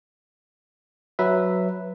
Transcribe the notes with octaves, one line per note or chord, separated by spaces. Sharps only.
F#3 B4 E5